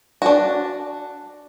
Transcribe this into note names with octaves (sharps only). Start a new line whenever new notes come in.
D4 F#4